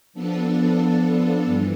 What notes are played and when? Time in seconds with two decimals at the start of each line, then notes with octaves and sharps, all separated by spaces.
0.13 F3 B3 D4 A4
1.45 G2 E3